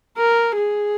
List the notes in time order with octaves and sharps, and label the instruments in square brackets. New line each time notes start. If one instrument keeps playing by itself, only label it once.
[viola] A#4
G#4